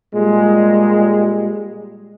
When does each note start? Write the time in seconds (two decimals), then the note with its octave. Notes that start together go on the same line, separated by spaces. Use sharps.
0.15 A#2 G3 G#3